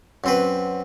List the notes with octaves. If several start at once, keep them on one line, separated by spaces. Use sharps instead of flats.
F#2 C4 B4